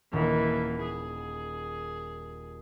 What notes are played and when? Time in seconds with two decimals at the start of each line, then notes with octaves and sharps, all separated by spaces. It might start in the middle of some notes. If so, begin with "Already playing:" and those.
0.13 D#1 E3 A#3
0.83 G#4